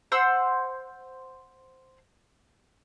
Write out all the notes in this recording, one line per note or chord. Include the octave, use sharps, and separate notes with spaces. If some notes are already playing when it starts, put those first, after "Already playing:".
C5 F#5 C6 E6